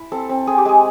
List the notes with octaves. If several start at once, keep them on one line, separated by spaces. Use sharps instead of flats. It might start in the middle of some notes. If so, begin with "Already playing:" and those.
Already playing: E4
C4 A4
C4
C4 G#4
G4
G#3 G#4